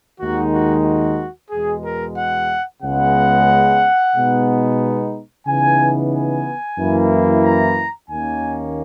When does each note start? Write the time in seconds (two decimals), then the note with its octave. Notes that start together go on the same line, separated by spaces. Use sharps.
0.19 D#2 D#3 G#3 D#4 F#4
0.52 F#4
0.84 F#4
1.50 E2 B2 G#3 G#4
1.84 A#4
2.17 F#5
2.82 C#2 C#3 G#3 B3 F#5
4.15 B2 G#3 B3 D#4
5.46 C#3 E3 B3 D#4 G#5
6.12 G#5
6.78 F#2 E3 A#3 E4
7.44 A#5
8.10 D#2 D#3 A#3 C#4 G#5